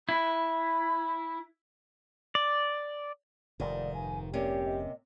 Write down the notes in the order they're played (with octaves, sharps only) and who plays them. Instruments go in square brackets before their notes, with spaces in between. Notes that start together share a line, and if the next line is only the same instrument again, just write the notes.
[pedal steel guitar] E4 [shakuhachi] B5
[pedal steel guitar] D5
[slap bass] F1 G#2 [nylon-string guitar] D#3 [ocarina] D5
[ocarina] G#5
[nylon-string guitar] C3 A#3 C#4 [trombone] G4 [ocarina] D5
[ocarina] D#5